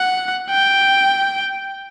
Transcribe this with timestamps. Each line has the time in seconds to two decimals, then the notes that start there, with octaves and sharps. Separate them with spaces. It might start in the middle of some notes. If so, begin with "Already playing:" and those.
Already playing: F#5
0.50 G5